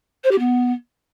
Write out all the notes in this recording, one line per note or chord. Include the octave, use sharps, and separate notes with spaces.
C5
G4
B3